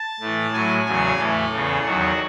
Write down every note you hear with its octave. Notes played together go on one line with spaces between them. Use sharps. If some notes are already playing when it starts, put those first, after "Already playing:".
Already playing: A5
A2 E3
A2 F#3 G#5
E2 C#3 F#3 G#5
A2 E3 A4
E2 C#3 E3
E2 D#3 F#3 F#4